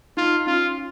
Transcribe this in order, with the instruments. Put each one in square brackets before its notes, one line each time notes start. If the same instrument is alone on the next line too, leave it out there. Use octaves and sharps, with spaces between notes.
[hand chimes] D#4 [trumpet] F4
[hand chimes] C#4 [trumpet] F4